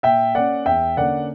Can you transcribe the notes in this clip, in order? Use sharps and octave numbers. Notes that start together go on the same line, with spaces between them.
A#2 E5 G5
A#3 C#4 D5 F#5
E2 E5 G5
D3 A#3 C#4 D5 F#5